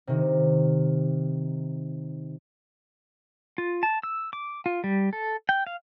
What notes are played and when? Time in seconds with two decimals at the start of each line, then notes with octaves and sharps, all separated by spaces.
0.07 C3 D#3
3.58 F4
3.83 A5
4.03 E6
4.33 D6
4.66 F4
4.84 G3
5.13 A4
5.49 G5
5.67 F5